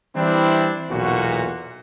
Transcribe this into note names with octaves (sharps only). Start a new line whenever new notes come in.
E3 G3 C4 D4 E4
B1 E2 A#2 F#4